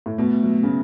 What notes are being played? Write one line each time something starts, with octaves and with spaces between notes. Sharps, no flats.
A2
B2 A3
F#3
C#3